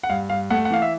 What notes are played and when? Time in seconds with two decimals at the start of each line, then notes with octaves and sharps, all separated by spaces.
0.03 F#5
0.10 G2 F5
0.30 G2 F5
0.50 A3 F#5
0.65 F#5
0.70 E3 F5
0.82 E5